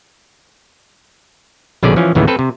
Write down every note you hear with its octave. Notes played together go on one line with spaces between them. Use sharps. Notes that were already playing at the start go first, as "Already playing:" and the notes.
A#1 B2 D3 C#4 G#4 D5
E3 F3 C#4
D#2 A2 C#3 E3 B3
C4 A4 B4
C3